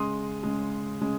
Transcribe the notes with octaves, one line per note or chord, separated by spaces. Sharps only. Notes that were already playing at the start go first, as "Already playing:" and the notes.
Already playing: C#3 G#3 C6 D#6
C#3 G#3
C#3 G#3